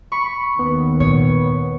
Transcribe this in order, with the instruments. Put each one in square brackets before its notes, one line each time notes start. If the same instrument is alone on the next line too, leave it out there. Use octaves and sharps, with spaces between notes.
[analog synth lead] B5 [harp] C#6
[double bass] D#2 [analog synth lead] B3
[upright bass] A#2 [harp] C#5